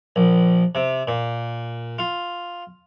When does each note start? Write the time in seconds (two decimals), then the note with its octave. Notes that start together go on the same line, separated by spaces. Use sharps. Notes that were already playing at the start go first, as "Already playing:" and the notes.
0.16 A#1
0.75 C3
1.07 A#2
1.99 F4